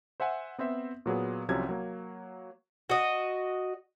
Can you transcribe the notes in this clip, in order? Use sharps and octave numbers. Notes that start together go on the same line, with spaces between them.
C5 E5 F#5 G#5
B3 C4 C5 E5
A#2 F#3 B3 G#4
C2 C3 F3 F#3 C#4 G#6
F#3 A#3
F#4 D#5